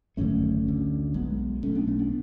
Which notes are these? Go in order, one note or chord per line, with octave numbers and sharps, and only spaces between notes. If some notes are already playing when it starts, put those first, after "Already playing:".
G#1 F#2 D3 A3 C#4
D2 D3
B1 B2 G#3 B3
B1 B2 A3 C#4
B3 D4
A3 C#4
B3 D4